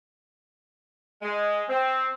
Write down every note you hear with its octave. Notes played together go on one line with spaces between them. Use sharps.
G#3
C4